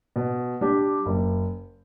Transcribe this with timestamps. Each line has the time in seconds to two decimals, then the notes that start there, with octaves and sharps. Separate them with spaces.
0.16 B2
0.61 G3 D4 G4
1.06 F#1